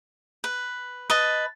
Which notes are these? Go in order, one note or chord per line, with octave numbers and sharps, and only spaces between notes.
B4
B4 D#5 A5